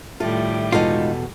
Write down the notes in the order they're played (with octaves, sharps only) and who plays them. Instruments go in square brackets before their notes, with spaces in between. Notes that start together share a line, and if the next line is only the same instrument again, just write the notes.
[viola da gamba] A2 D#3 G3 [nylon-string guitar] F4 A4 [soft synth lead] E5
[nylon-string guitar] E2 B2 A4 [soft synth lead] G#3 [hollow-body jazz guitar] D#4 F4